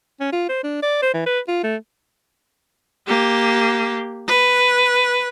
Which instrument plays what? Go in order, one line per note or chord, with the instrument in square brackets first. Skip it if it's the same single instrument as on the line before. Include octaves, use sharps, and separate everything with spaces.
[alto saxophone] C#4
F4
C5
D4
D5
C5
E3
B4
F4
A3
[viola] A#3 G4
B4